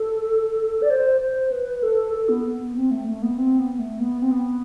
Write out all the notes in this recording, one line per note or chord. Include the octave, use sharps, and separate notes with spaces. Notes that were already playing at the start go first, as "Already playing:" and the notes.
Already playing: A4
D5
C5
C5
B4
A4
A4
B3
B3
C4
A3
A3
B3
C4
B3
A3
B3
C4
B3